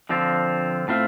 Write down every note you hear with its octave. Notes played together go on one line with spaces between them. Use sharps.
D3 F3 C4 F4
A2 A3 C4 F4